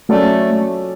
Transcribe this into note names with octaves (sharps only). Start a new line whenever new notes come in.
F#3 A3 C#4 F#4 A4 D5